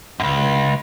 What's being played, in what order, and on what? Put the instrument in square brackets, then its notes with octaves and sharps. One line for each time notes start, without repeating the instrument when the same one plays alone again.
[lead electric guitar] C#2 F#2